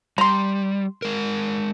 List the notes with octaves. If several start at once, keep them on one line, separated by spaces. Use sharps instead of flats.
G3 A#5 C6
G#3 A#4